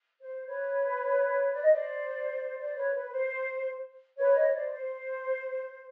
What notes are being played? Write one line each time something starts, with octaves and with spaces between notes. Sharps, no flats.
C5
B4 C#5
D5
D#5
C5 D5
C5 D5
B4 C#5
B4
C5
B4 C#5
C#5 D#5
C#5
C5 D5
C5